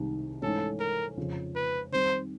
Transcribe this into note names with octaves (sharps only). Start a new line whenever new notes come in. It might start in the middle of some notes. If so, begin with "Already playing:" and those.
Already playing: C2 C3 D#3 G#3
G#2 E3 A3 C#4 A4
A#4
F2 C#3 F3
B4
D#3 G3 C4 C5